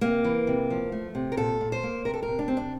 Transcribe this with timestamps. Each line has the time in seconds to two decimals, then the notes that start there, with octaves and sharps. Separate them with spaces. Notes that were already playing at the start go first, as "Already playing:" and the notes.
0.01 C3 A#3
0.24 E3
0.47 C3
0.70 F3
0.92 A3
1.15 C3
1.32 A#4
1.37 A#2 A4
1.61 A#2
1.72 C5
1.83 A#3
2.05 C3 A#4
2.14 A4
2.23 A#4
2.28 C3
2.39 D4
2.48 C3 C4
2.57 D4